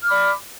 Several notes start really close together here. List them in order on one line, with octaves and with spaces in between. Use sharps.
F6 D6 B5 D5